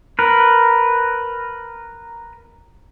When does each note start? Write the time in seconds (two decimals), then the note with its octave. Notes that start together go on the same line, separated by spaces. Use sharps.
0.19 A#4 B4